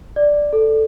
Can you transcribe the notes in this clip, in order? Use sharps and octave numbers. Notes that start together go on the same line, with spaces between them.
D5
A4